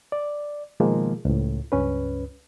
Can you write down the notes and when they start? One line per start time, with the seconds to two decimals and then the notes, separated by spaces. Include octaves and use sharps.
0.12 D5
0.80 B2 D#3 F3 G#3 A#3
1.25 C#2 A2
1.72 C#2 G2 C#4 B4